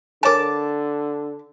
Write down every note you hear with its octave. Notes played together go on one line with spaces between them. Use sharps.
D3 A#4 C#5 G#5 A5 D6